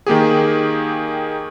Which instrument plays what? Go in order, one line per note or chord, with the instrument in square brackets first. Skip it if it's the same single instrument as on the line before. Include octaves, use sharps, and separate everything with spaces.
[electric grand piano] D#3 A#3 G4 G#4